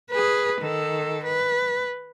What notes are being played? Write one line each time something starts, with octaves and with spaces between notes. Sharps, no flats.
G#4 B4
D#3 A4
B4